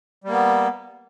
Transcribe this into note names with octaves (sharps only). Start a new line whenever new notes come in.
G3 A#3 B3